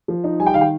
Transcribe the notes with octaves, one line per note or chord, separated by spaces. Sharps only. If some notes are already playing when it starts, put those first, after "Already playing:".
F3
D#4
G3 G#5
G5
D#3 F5
G5